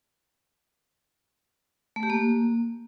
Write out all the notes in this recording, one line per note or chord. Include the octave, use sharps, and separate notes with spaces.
A3
G4
A#3